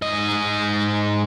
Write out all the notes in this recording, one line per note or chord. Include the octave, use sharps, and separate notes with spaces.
G#2 D#5